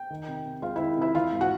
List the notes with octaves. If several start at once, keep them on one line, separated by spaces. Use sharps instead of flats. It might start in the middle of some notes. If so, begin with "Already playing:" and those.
Already playing: G5
D#3
C3
C3
G#3 F4 F5
D#3 E4 E5
C3 E4 E5
E3 F4 F5
G#2
F#4 F#5